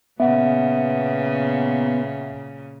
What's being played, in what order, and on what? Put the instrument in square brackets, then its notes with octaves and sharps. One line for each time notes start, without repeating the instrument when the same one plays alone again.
[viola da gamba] A#2 C#3 [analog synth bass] B3 [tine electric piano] E5 F#5